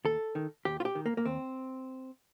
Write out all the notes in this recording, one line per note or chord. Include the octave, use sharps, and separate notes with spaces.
D#2 A4
D#3
D#2 G4
F4
G4
D#3
A#3
A#3
D#2 C4